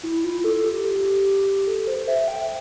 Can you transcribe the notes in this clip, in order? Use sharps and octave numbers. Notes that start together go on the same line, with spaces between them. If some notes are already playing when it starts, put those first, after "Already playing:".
E4
F4
A4
G4
A4
C5
E5
G5